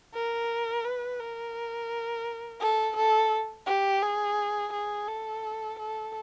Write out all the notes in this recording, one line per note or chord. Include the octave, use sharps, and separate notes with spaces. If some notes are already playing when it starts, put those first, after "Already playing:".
A#4
B4
A#4
A4
A4
G4
G#4
G#4
A4
A4